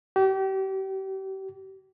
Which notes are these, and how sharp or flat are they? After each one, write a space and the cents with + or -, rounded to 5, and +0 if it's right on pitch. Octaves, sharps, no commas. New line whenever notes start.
G4 -35